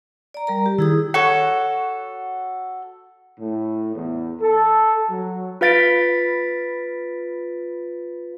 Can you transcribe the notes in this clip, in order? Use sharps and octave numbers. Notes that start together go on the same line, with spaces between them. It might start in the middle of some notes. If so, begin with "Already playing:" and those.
D5 A#5
G3 A#4 A#5
G4
D#3 E4 G#4 D#6
F#4 A4 C#5 F#5
A2
E2
A4
F#3
F4 B4 F5 A6 B6 D7